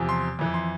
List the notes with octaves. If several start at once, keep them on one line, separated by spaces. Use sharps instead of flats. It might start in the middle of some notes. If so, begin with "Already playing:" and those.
Already playing: E2 C3 F3
C6
F2 E3
C6